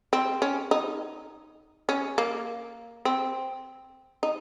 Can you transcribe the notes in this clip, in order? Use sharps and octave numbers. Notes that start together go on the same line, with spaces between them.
C4
C#4
D#4
C#4
A#3
C4
D#4